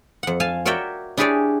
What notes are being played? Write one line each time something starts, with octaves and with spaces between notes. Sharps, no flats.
F2 F#5
F5 G#5 A5
F#4 A#4 C#5 D5 E5 G5
D4 E4 G4 G#4 C#5 D5